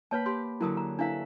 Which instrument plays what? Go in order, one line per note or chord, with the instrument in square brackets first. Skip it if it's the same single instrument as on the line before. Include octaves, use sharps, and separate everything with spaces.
[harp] A#3 G5 B5 [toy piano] B4 C#5 A5
[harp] G4 [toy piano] C6
[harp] F#2 D3 F#3 [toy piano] E4 A#4 D#6
[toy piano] A#5
[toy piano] D4 E4 F5 [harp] A4 B4 E5